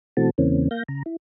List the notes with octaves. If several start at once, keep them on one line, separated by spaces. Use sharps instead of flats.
B2 E3 A3 C4 F#4 A5
E2 C#3 E3 A#3 C4 C#4
A#3 F5 G6 A#6
C#3 A#5
E4